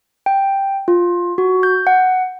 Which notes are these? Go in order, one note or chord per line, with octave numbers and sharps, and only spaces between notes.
G5
F4
F#4
G6
F#5